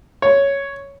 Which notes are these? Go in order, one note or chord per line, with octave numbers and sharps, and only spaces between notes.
C#5